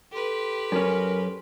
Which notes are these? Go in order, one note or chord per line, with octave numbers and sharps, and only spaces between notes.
G4 A4 B4 C6
F#2 C#4 A#4